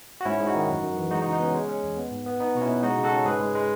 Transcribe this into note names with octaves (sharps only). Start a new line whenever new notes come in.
F#4
G#2 C#4 E4
G#2
D#4 F#4
D#3
F#2
F#2
E3
G#3 D#4 F#4
C#3 D#4 F#4
D#4
B3 C#4
G#3
C#4
E2
B3
G#2
B3
B3 D#4
B2 F#4
C#4 E4
B2
G#3 D#4 F#4
C#3
F#4 A4
C#4
G#2 G#4 B4
G#3
G#3